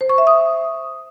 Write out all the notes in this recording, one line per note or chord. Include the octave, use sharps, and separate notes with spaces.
C5
C#6
E5
D#6